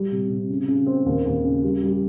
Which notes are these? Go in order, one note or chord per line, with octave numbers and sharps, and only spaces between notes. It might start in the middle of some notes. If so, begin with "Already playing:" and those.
Already playing: G3
C3
C3
C#3
C#3
C4
D#2
D#2
C#3
G3
G3